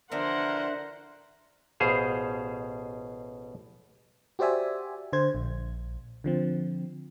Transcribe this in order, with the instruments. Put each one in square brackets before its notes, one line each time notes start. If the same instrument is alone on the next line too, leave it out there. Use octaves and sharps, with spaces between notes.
[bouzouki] D3 E3 F3 [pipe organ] D4 E5 [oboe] A#4 [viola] C5 F#5
[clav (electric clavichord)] A1 B2 G#4 C5 F5
[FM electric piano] F#4 G4 C5 D5 E5 G#5
D3 C5 G#6
A#1
D3 F3 C4